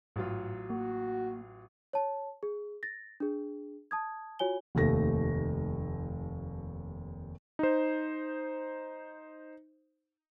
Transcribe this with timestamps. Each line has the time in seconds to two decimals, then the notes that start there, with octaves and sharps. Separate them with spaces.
0.16 A1 G#2 F#3 F4
0.70 A#3 F#4
1.93 C#5 A5
2.43 G#4
2.83 A6 A#6
3.20 D4 G#4
3.91 A5 D#6 G#6
4.39 F4 F#4 C#5 G#5 G7
4.75 F1 D#2 A3 A#6
7.59 D#4 C5